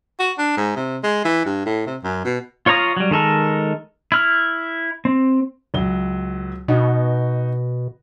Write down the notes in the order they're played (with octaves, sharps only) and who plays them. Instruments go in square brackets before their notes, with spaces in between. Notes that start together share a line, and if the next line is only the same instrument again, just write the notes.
[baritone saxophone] F#4
D4
G#2
C3
G#3
E3
G2
A2
C3
F#2
B2
[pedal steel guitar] F4 C#5 F5 A#5 D#6
F#3 G3
D#3 G#3 A4 A#4
E4 F6
C4
[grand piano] C#2 F#3 G7
[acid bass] B2 [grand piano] D#4 F#4